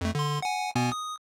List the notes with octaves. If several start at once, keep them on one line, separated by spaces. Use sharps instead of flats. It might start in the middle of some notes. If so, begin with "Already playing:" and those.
F2 A3
D3 C6
F#5 G#5
B2 B3 G#5
D#6